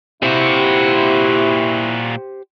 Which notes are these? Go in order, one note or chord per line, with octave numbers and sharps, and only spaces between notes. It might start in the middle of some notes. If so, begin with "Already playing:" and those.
A#2 E4 F#4 G4 C5